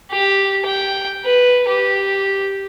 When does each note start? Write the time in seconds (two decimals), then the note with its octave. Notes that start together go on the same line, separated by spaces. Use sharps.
0.11 G4
0.65 G5
1.25 B4
1.68 G4